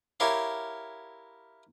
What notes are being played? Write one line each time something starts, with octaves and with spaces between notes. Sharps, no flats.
E4 G4 A#4 C#5 F5